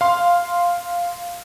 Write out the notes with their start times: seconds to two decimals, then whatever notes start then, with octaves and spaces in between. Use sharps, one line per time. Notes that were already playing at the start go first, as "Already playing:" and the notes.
0.01 F5 C6